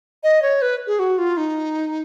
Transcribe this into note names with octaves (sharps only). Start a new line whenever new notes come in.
D#5
C#5
B4
G#4
F#4
F4
D#4